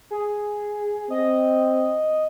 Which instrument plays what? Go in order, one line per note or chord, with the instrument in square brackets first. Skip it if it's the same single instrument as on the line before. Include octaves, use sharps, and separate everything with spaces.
[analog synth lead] G#4
[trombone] C4 [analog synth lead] D#5